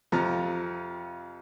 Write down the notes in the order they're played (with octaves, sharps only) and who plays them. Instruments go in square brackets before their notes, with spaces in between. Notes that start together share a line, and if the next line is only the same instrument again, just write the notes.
[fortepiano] F2 C3 F3 A#5